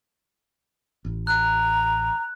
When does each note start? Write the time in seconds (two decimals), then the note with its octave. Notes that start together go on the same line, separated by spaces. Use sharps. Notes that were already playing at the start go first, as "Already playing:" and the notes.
1.05 A1
1.27 A#5 F#6